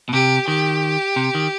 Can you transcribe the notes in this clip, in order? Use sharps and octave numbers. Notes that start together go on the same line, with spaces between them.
B2
C3 G4
D#3 G4
C3
D#3